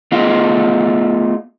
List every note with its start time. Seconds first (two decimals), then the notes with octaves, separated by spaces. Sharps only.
0.12 A3 B3 F4 G#4 D#5 F5